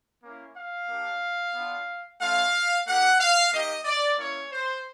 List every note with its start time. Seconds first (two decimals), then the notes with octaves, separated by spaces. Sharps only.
0.23 A#3 C#4 E4
0.57 F5
0.88 A#3 D4 G4
1.54 B3 D4 F4
2.20 A3 C#4 F4 F5
2.87 A#3 D#4 G4 F#5
3.20 F5
3.52 A#3 D#4 G4 D#5
3.85 D5
4.18 A#3 C#4 E4 C#5
4.52 C5